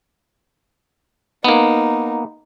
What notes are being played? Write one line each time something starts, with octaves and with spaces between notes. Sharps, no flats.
A#3 B3 D#4